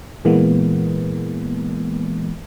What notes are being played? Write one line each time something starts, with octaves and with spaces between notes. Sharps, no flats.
A#2 E3 G#3 A#3 B3